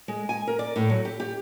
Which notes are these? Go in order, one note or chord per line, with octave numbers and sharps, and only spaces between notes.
G#3
G#5
A#4
D5
A2
F#3
G4
G4